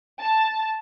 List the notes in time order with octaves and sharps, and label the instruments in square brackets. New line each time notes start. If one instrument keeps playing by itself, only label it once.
[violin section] A5